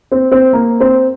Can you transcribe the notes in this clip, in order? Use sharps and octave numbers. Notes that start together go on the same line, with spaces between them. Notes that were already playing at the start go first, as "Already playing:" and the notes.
C4
C4
A#3
C4